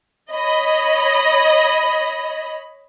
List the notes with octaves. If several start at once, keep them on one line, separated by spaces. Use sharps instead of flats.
C#5 D#5 B5